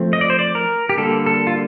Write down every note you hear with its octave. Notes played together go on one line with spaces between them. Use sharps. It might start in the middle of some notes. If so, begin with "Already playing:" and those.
Already playing: F3 A3 C4
D#5
D5
C5
D5
A#4
G4
D3 G3 A#3 A4
A4
F4